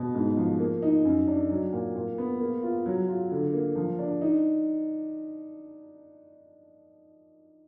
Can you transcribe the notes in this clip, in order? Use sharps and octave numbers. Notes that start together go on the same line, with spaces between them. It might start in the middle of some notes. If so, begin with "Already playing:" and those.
Already playing: B2
G#2
F3
A#3
D#4
F#2
D4
F#3
A#2
A#2
B3
A#3
F4
F#3
F4
D3
A#3
F3
D4
D#4